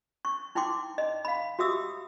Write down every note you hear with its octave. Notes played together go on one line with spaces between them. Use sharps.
C#6
D#4 E4 G5 C6 D6
D#5
F5 B5
F#4 G4 E5 D#6 E6